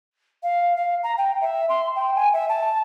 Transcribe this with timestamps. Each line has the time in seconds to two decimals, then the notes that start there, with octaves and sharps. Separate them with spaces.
0.43 F5
0.76 F5
1.03 A#5
1.17 G5
1.41 E5
1.69 C6
1.95 G5
2.16 G#5
2.33 E5
2.49 A5